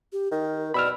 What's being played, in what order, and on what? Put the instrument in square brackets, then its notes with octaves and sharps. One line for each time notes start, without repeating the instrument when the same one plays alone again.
[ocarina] G4
[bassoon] D#3 [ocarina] A#4
[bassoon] B2 [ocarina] D5 [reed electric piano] B5 E6 F6